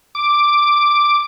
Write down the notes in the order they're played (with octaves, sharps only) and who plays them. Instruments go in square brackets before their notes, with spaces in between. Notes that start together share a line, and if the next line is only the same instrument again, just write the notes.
[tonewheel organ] D6